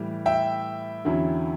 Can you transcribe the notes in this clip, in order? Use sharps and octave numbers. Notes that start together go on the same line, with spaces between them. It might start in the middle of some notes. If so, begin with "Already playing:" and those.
Already playing: A2 E3 G3
E5 G5
E2 D3 F#3 C#4 E4